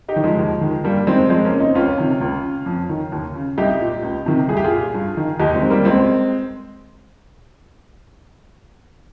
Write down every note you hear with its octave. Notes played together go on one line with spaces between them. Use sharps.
D#4 G4
D#3
F3 G#3
D#2
D#3
G2 G3 A#3
D#3 G#3 C4
F2 G#3 C4
A#3 C#4
C#3
C4 D#4
C#2 C#4 F4
C3 D#3
C#2
C#3
F2
D#3
D#2
C#3
C2 D#4 G4
A#2
C#2
C3 D#3
C2 G#4
G4
F4 G#4
A#2
G2
D#3
D#2 D#4 G4
G#3 C4
D#3
G3 A#3
C#2 G#3 C4